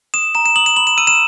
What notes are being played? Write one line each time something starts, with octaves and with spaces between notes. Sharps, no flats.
D#6 E7
A#5 E7
E7
D#6 F#7
E7
B5 F#7
E7
E6 D#7
E7